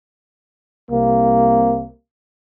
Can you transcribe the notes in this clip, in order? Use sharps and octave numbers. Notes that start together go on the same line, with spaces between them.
C2 C3 A#3